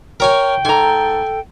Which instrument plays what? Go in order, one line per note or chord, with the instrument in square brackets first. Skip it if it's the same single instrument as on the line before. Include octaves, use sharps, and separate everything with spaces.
[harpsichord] A#4 C#5 G#5 [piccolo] G5
[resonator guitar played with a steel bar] G#2 A#5 [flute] A4 [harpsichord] G#5